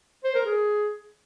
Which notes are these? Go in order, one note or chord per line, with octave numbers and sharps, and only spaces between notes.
C5
A#4
G#4